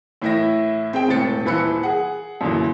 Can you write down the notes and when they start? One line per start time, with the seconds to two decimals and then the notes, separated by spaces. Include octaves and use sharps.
0.22 A2 E3 E4 E5 A#6
0.93 C4 G#4 G5
1.08 E1 A2 C3 A6 C#7
1.46 D#1 E3 B4 B5 E6 C#7
1.83 G#4 F#5
2.41 F#2 A#2 D3 E3